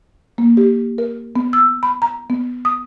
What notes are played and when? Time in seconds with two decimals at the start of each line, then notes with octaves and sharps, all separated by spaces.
0.38 A#3
0.57 G4
0.98 A#4
1.36 B3
1.53 E6
1.83 B5
2.02 A#5
2.30 B3
2.65 D#6